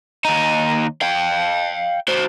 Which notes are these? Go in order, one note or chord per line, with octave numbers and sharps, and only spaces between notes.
D#2 D#4
F5 G5
F#4 C5